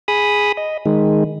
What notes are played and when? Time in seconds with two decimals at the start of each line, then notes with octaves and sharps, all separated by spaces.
0.08 G#4 B5 D#6
0.57 D#5
0.86 D#3 G#3